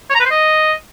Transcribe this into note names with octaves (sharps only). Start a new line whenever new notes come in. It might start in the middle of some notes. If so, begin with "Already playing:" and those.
C#5
A#5
B4
C5
D#5